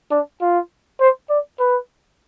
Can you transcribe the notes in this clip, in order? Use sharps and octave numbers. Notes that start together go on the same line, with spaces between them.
D4
F4
C5
D5
B4